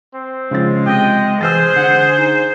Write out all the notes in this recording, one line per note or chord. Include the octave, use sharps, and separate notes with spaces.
C4
C#3 F3 G#3 A6
C3 D#5 G5
E3 G#4 C5 E6 F6 A6
D3 F#5
D#4